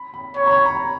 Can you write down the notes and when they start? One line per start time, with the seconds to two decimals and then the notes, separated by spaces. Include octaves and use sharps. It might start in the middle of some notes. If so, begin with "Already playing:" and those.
Already playing: B5
0.14 B5
0.36 C#5 B5
0.46 A#5
0.51 B5
0.65 A#5